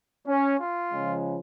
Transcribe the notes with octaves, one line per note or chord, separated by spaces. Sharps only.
C#4
F4
C#3 F3 G#3